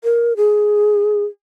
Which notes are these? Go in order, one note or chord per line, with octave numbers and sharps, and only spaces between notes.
A#4
G#4